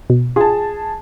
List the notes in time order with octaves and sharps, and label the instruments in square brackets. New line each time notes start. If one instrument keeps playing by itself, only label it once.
[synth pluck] B2
[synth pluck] F4 [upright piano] G#4 A5